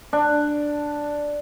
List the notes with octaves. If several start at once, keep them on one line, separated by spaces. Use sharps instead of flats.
D4